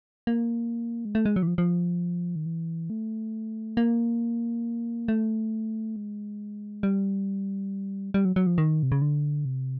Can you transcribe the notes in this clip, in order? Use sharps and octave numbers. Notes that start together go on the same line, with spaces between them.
A#3
G#3
A3
G#3
F#3
E3
F3
F3
D#3
E3
A3
A#3
A3
G#3
G3
G3
F#3
F#3
F3
D#3
C3
C#3
D3
C3